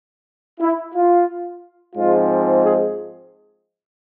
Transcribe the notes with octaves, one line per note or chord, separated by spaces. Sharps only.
E4
F4
G#2 F3 G#3 C4 F4
G#4